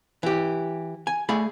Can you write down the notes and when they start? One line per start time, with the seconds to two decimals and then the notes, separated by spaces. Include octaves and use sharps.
0.23 E3 G4
1.07 G#5
1.29 A3 G#4 D5 B5